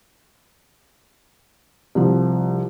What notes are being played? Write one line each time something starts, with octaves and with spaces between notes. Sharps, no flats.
C2 F3